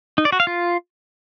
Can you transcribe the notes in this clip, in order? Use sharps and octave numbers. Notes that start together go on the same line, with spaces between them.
D#4
D5
F#4
F5
F4